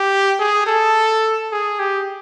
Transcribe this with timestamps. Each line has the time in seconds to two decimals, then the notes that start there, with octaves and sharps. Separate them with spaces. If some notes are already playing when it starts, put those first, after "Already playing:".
Already playing: G4
0.39 G#4
0.67 A4
1.52 G#4
1.80 G4